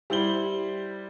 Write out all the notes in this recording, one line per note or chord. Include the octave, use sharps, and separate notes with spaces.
G3 E4 C5 F#7 G7